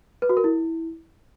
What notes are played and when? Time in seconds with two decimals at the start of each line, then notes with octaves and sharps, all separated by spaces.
0.22 B4
0.29 F#4
0.37 A#4
0.44 E4